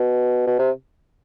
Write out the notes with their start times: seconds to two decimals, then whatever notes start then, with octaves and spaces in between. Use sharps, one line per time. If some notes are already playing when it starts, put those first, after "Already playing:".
Already playing: B2
0.47 B2
0.59 C3